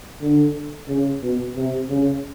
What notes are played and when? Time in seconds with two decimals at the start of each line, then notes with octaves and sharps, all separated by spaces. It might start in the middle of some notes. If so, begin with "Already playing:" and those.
0.21 D3
0.88 C#3
1.22 B2
1.56 C3
1.89 C#3